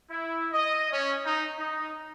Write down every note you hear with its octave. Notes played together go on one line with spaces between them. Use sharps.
E4
D#5
C#4
D#4
D#4